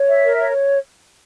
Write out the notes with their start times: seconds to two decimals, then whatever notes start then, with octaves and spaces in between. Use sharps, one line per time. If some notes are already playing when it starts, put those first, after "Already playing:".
Already playing: C#5
0.08 E5
0.25 A#4
0.39 C#5